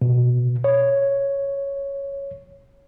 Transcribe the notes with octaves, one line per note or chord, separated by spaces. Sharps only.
B2
C#5